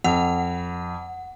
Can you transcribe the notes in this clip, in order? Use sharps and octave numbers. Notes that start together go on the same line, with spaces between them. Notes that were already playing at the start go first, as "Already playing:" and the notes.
F2 F#5